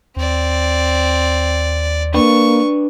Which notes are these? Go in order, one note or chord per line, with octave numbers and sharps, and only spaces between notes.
D#2 C4 D5
A#3 D4 B4 C#6